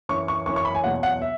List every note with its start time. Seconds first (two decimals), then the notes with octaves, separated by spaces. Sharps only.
0.09 F#2 E3 C#4 C#6
0.28 C#6
0.46 F#2 E3 C#4 C#6
0.56 C#6
0.65 B5
0.75 G#5
0.84 E2 B2 F#3 F#5
1.03 F#5
1.22 E5